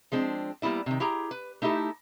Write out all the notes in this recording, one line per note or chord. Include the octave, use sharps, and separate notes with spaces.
F3 G#3 C4 D4
G3 A#3 B3 E4 D5
C3 D#3
E4 G4 G#4 A#5
B4
A3 D#4 E4 G4 A4